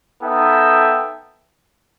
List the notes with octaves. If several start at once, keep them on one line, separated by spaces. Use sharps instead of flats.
B3 D#4 A4 E5 G5